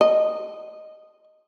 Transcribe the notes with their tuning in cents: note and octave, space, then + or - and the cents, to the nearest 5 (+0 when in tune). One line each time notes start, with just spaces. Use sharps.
D#5 -5